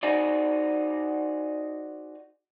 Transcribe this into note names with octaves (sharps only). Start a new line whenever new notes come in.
D#4 F#4 G#4 C5 D5